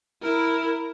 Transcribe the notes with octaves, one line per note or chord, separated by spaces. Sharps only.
E4 A#4